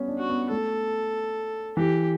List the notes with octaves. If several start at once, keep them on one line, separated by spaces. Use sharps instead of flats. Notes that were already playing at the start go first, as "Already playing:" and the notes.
Already playing: G3 B3 C#4
D4
F#4
B3
A3 A4
E3 G4